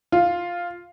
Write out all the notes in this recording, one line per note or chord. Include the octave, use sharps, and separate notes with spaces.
F4